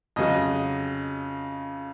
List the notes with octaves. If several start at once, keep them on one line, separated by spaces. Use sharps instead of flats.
F2 C#3 F#3 D#5